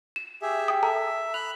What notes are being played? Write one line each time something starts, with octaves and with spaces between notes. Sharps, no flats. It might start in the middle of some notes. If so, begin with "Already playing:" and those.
E7
G4 G#4 E5
G5 D#6
A4 E5 A5 A#5
B5 F#6 F7